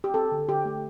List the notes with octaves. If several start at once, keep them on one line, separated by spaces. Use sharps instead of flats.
G4
C4 A4
D3
D3 G4
A3